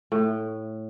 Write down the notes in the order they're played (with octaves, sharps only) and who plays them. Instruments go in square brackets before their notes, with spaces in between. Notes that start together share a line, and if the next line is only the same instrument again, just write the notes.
[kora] A2